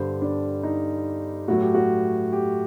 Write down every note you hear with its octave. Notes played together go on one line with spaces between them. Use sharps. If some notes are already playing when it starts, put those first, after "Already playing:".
Already playing: G2 D3 G3 C5
D4
D#4
A2 F#3 F#4
G4
F#4
G4